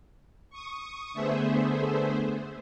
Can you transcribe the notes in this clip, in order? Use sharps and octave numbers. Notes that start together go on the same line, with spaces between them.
C#6 D#6
D3 A3 B3 G#4 C5 E5